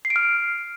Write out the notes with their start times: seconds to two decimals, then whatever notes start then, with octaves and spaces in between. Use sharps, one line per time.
0.05 C7
0.10 D7
0.16 F6